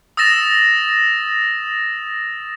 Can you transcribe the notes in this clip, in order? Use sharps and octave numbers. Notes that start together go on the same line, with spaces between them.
D#6 E6 A6 A#6 E7